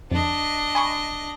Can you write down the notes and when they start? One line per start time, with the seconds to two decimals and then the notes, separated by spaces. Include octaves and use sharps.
0.11 F2 D4 D#5
0.75 G#5 B5 C#6